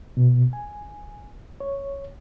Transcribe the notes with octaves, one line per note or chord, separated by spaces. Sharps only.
B2
G#5
C#5